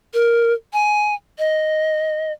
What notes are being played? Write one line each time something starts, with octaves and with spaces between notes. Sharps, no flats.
A#4
G#5
D#5